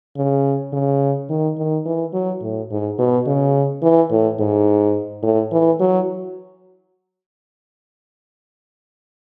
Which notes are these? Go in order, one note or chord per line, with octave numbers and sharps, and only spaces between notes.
C#3
C#3
D#3
D#3
E3
F#3
A2
G#2
B2
C#3
E3
A2
G#2
A2
E3
F#3